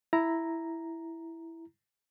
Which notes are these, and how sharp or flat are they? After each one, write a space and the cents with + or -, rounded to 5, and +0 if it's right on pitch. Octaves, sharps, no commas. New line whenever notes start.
E4 +0 A#5 +0